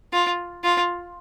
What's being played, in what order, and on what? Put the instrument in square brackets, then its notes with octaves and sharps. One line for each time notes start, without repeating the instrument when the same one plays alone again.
[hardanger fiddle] F4
F4